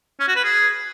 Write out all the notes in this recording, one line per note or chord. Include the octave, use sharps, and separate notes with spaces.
C#4
F#4
B4
G#4